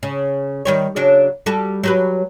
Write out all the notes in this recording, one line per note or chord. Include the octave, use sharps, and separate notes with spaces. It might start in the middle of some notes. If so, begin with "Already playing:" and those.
C#3
D#3 G3 C#5
C#3 F#3 D4
G3 F#4 A4
F#3 G4 B4